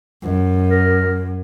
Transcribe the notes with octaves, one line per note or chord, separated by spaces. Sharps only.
F#2
A#4